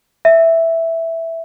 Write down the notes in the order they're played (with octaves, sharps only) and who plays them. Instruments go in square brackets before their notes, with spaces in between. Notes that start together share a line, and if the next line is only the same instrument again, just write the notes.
[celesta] E5